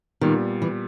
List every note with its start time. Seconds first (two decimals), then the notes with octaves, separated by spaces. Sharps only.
0.21 A#2 D#3 G3 B3
0.62 E3